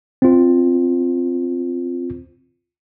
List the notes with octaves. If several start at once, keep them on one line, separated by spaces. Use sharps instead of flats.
C4 F4